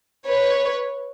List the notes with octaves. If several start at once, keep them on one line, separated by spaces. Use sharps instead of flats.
B4 C#5